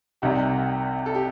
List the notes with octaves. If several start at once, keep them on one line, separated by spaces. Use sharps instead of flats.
C2 C3 G3 D#4 G4
A4
G4